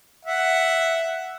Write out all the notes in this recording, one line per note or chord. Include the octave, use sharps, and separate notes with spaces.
E5 F#5